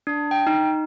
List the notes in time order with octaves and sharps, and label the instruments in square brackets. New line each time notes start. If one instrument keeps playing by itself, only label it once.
[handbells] D4
G5
D#4